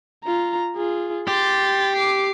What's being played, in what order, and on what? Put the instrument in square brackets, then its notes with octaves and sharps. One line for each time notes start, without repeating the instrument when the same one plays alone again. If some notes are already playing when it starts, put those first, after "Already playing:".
[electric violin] F4 A#5
F4 G#4
[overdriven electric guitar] G4 [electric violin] C6 A6
[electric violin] D6 C7